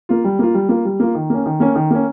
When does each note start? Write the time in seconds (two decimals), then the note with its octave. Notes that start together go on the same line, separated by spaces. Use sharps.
0.09 A#3 F4
0.24 G3
0.39 A#3 F4
0.54 G3
0.69 A#3 F4
0.85 G3
1.00 A#3 F4
1.15 D#3
1.30 A#3 C#4
1.46 D#3
1.60 A#3 C#4
1.75 D#3
1.91 A#3 C#4